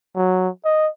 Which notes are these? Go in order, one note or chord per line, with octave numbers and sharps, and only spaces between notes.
F#3
D#5